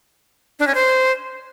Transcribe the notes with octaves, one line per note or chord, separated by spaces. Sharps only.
D4
C#4
C5